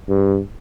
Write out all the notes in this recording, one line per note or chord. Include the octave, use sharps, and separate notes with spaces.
G2